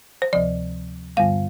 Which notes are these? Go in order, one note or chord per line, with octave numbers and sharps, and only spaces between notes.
C5
D2 C3 F3 D5
G2 D3 G3 B3 F5